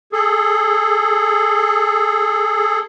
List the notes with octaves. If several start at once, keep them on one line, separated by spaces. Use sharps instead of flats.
G#4 A4